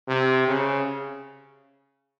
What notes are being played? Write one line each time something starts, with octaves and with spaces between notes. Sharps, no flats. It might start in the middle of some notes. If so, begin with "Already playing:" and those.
C3
C#3